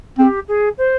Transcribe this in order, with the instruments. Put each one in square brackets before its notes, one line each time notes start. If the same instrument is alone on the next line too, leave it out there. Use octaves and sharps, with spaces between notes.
[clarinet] C4 [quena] G4 G#4
[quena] G#4
C5